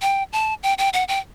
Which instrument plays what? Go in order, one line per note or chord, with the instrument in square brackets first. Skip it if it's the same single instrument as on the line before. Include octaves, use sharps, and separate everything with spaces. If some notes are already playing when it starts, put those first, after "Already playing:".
[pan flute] G5
A5
G5
G5
F#5
G5